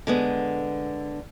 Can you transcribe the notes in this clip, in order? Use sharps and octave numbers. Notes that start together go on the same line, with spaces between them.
D3 G#3 B3